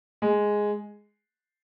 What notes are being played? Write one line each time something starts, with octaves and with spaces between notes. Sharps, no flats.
G#3